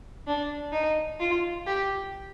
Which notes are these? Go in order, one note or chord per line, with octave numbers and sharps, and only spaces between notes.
D4
D#4
F4
G4